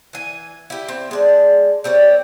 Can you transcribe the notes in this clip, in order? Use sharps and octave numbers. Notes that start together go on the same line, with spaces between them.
E3 G#5
E4 G4
C4
G#3 D5 A5
G3 C4 C#5 D5